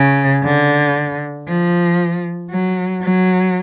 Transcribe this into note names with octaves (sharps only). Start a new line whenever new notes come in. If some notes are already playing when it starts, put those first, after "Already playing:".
Already playing: C#3
D3
F3
F#3
F#3